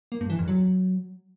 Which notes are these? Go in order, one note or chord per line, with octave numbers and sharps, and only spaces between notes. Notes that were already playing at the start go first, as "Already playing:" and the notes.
A#3
G2
E3
F2
F#3